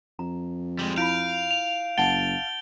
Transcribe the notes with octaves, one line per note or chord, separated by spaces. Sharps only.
F2 A#5
G3 G#3
E4 F4 F5 B5 G6 D7
F7
F#1 F#5 A5 A6 D7 G7